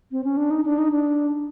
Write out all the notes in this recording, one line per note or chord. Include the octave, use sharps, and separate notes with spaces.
C4
C#4
D4
D#4
D4
D#4
D4